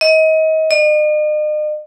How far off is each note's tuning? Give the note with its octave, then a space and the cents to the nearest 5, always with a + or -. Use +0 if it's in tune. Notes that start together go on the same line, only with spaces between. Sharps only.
D#5 +30
D#5 -45